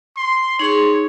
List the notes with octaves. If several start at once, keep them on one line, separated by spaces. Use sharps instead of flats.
C6
D#4 G#4 C#5 C6